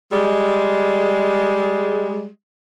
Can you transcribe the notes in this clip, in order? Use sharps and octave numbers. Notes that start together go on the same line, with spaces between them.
G3 G#3